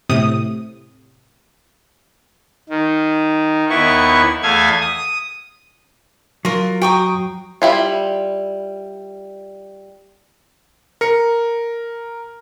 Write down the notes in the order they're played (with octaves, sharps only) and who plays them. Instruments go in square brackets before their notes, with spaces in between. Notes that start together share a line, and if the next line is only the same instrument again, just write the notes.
[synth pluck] A2 C3 D#6
[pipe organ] D#3
D#2 B3 E4 C#6
E2 A3 E5 F5 G#5 G#6
D#6
[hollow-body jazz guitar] F#3 [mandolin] F4 A#4
[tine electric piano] F#4 A#5 [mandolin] G5 C#6 D#6
[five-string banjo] G3 E4 F4
[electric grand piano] A#4 C#7